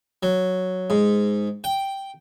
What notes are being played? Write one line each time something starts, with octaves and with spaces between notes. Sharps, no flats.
F#3
G#2
G5